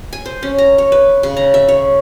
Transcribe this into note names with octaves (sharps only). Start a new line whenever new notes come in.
G#5
C5
C#4
A#5
C#5
B4
C#3
A#5
E5
C#5